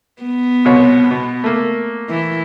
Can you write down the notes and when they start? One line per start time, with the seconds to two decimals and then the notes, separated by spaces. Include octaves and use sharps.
0.22 B3
0.65 C2 B2 C#5
1.11 B2
1.44 A3 A#3
2.09 E3